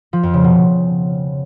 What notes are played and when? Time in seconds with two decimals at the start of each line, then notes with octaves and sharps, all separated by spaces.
0.13 F3
0.23 F2
0.34 C#3
0.44 B2
0.54 C#3